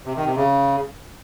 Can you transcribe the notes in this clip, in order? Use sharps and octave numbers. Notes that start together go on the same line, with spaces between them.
C3
D#3
C3
C#3